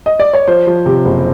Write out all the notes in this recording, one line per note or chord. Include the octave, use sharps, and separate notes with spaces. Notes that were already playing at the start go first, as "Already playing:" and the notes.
D#5
D5
C#5
F3 C5
F3
C3
F#1